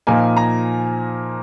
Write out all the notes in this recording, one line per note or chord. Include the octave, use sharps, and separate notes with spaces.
A#2 F3 A#3 D#4 G#5
A#5